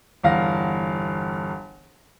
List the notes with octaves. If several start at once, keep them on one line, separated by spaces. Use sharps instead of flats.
G1 E2 F5 A#6